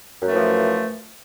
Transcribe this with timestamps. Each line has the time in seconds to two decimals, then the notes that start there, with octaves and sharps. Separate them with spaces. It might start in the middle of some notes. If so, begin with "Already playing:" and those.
0.20 F#2
0.25 A3
0.30 E3
0.35 F3